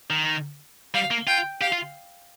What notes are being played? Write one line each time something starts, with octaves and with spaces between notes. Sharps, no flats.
D#3
G3 F5
A#3
F4 G5
G4 F5
F4